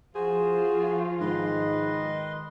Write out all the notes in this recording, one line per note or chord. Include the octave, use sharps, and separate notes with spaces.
F3 F4 F#4 G#4 C5
G#2 D#3 B4 D#5 C6